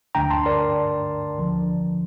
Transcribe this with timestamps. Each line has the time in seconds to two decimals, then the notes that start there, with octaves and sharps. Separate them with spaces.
0.15 D2 D3 A3 D4 G5 A#5
0.30 A5 C6
0.46 A#4 D5
1.38 D2 D3 F3